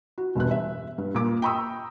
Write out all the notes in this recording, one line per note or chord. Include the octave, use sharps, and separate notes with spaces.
F#4
E1 G2 F#6
E5
G2
A#2 D6
G5 A#5 B5 C#6 D#6 E6